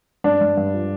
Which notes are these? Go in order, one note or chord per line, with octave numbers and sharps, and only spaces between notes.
G2 D4
G2
G2
F3